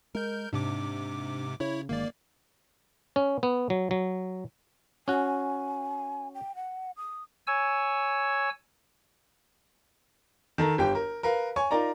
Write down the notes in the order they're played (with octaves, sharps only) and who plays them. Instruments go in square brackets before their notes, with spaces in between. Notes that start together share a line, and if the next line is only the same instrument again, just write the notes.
[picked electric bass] G#3 [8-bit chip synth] A#4 G6
[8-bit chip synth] G#2 C3 D6 [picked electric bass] D4
[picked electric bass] C#3 [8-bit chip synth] E4 C#5
[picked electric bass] G1 D#3 G#3 [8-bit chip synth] A#3 D5
[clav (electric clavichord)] C#4
B3
F#3
F#3
[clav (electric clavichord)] C#4 F#4 [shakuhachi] G#5
[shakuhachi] G5
F#5
D#6
[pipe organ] C#5 G#5 E6
[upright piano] D#3 A4 A#5
G1 G4 G5
A#4
A#4 B4 F5
C#5 G#5 C#6
D#4 F4 A#4 D5 A#5